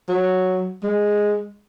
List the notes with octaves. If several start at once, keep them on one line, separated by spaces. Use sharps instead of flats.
F#3
G#3